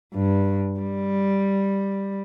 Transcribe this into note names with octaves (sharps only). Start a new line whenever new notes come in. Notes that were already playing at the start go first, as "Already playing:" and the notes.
G2
G3